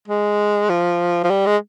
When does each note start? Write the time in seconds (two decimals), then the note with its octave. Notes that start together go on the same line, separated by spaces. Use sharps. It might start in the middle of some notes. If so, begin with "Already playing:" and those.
0.08 G#3
0.69 F3
1.24 F3
1.30 G3
1.46 G#3